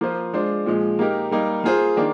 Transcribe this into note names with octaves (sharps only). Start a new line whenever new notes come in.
F3 A#3 F4 C5
G#3 D4 F4 C5
A#2 F3 G#3
A#3 D#4 G4 A#4
G3 A#3 D#4
A#3 F4 G#4 C5
D#3 A#3 D4